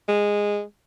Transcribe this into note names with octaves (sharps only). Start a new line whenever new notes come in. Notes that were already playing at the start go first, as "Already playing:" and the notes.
G#3